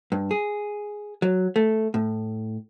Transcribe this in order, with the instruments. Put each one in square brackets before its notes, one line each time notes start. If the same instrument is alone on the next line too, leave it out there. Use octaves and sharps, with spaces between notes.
[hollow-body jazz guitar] G2
G#4
F#3
A3
A2